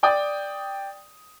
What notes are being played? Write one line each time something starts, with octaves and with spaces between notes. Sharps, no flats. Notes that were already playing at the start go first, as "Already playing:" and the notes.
D5 G5 D#6